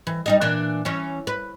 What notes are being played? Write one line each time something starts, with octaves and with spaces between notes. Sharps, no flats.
E3
G3 D#4 D#5
A#2 E3 D4
E3 C#4
B4